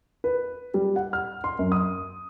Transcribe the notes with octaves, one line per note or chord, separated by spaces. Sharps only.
B4
G3
F#5
F6
C6
F#2
D#6